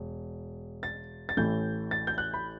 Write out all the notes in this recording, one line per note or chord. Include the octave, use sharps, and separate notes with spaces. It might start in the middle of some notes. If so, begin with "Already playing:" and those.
Already playing: E1
A6
A6
A1 A2 E3 A3 G6
A6
G6
F#6
B5